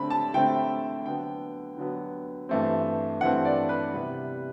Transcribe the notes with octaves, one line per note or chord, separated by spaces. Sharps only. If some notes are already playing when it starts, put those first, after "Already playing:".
Already playing: D3 A3 C4 B5
A5
D3 A3 C4 G5
D3 F#3 B3 G5
D3 F#3 B3
G2 E3 A3 C4
G2 E3 A3 C4 F#5
D5
B4
C3 G3 B3 E4